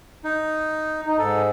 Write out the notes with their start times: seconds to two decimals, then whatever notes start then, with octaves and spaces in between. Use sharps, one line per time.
0.24 D#4
1.06 D#4
1.19 G#2 A4